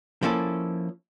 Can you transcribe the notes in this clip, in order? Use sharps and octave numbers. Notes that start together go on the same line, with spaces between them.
F3 A#3 C#4 E4 A4